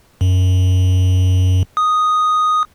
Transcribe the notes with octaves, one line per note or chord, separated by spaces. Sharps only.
F#2
D#6